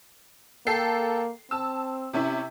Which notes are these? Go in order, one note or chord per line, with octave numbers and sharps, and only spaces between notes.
A#3 A4 G5 C7
C4 A5 E6
C3 C#4 E4